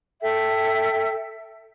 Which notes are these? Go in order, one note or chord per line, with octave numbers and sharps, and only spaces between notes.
A4 E5 G5